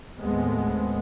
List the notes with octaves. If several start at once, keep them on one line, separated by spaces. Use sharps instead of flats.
D#2 A2 G#3 A3 B3 C4